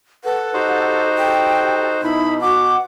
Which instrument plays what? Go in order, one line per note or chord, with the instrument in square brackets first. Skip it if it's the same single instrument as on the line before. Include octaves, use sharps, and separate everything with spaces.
[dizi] A4 [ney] B4 [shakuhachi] F#5
[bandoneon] D#4 F#4 C5 [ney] G4
[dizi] A4 [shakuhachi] G5
[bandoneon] B2 [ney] D#4 [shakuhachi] E4 [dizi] B5
[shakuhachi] F#4 [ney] F#5 [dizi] D6